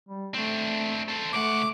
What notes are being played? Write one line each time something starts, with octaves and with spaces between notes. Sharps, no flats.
G3
A3 C4 D4
A4 C5
C#2 A3 F#5 D6